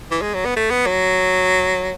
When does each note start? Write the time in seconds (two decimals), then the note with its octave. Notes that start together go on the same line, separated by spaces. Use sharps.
0.11 E3
0.22 G#3
0.34 F#3
0.45 B3
0.56 A3
0.70 B3
0.86 F#3